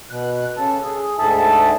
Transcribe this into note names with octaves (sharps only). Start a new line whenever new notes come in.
B2 F#6
C#3 A4
G#4
D2 G#2 G#4 A4 E5 A5